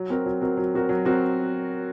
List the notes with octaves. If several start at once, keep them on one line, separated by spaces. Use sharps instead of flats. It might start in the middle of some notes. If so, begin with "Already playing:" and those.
Already playing: F#3
C4 F#4 A#4
F#3
C4 F#4 A#4
F#3
C4 F#4 A#4
F#3
C4 F#4 A#4